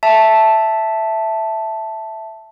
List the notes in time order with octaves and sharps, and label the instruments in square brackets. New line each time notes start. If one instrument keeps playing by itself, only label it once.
[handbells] E5 A5